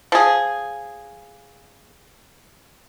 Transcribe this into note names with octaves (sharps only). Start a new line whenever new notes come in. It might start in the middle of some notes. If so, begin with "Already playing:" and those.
F3 G#4